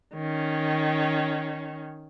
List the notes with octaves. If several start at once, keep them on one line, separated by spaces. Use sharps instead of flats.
D#3 C#4